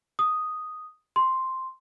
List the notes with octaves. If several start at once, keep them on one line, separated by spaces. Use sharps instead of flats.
D#6
C6